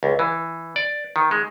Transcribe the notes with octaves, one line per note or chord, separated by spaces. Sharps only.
C#2
E3
D5
D#3
G#3